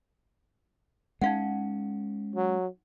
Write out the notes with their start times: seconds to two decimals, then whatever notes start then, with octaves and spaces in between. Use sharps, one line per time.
1.22 G#3 C#4 D#4 F5 F#5
2.36 F#3